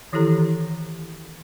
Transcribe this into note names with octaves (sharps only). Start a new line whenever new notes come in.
D#3 E3 E4 G4 A4 A#5